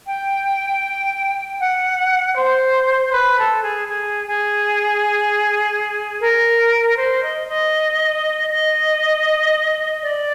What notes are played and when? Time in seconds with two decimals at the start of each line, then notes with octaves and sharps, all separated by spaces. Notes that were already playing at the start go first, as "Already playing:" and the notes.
0.05 G5
1.59 F#5
2.35 C5
3.12 B4
3.38 A4
3.63 G#4
3.88 G#4
4.27 G#4
6.20 A#4
6.96 C5
7.22 D#5
7.47 D#5
8.49 D#5
10.03 D5